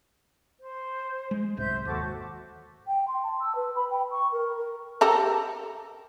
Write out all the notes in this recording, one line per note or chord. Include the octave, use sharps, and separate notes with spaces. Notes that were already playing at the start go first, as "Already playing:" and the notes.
C5
G#3
F#1 C2 G#2 C5 E5 G6
D#2 F#4 A4 D6
G5
C6
A5
E6
B4
B5
G5
C#6
A#4
A#4
G4 A4 A#4